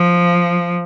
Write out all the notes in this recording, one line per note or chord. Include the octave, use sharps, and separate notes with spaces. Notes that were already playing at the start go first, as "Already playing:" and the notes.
Already playing: F3